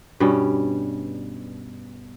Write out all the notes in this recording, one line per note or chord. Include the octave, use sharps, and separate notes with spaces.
G2 B2 G3 C#4